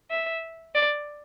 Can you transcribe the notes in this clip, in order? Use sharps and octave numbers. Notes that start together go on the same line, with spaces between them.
E5
D5